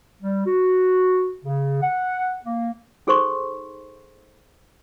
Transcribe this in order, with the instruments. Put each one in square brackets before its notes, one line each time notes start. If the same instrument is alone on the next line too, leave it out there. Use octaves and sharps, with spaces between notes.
[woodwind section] G3
F#4
C#3
F#5
A#3
[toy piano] D#4 G#4 A4 C5 C6 C#6